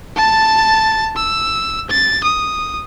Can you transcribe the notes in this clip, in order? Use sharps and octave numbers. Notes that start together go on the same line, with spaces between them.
A5 A6
E6
A6
D#6